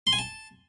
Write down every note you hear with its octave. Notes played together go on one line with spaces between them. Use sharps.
C6
G#5
A5